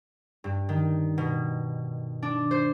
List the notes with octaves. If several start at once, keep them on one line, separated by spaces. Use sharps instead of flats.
G2
D#3
B2
D4
C5